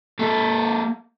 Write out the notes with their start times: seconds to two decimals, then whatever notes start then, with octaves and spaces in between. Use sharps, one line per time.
0.19 A#3 A4